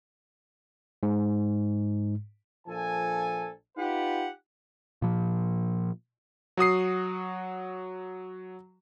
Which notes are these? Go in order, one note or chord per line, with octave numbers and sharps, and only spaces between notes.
G#2
A#1 F3 A4 G#5
D#4 F4 G4 B4 F#5
A#2 F3
F#3 F#4 D#6 C7